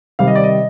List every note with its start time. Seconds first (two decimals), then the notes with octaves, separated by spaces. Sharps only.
0.19 C3 D#3 G3 F5
0.27 D#5
0.35 D5
0.43 D#5